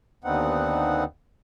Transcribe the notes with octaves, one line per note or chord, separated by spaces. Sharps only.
D#2 D3 B3 C4 D#4 F#5